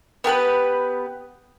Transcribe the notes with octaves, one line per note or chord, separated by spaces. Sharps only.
B3 G4 A#4 B4